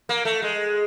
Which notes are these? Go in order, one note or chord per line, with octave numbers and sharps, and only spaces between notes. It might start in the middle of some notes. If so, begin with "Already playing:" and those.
A#3
A3
G#3